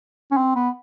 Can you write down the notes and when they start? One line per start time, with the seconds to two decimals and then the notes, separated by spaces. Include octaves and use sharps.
0.31 C#4
0.37 C4
0.56 B3